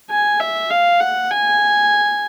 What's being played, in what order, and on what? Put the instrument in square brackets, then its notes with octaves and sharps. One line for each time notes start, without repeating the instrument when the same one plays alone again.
[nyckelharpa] G#5
E5
F5
F#5
G#5